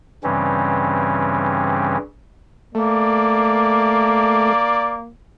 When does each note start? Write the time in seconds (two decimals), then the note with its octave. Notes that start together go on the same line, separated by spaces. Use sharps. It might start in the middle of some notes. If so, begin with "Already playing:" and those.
0.24 G2 C#3 E3 G3 C4 C#4
2.75 A3 A#3 D5